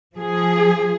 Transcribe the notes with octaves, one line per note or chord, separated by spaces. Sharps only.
F3 G#4